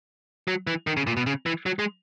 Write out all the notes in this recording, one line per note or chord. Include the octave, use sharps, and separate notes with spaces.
F#3
E3
D#3
C#3
A#2
B2
C#3
E3
F#3
G#3